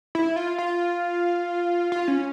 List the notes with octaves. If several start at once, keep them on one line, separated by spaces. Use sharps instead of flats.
E4
F4
F4
F4
C#4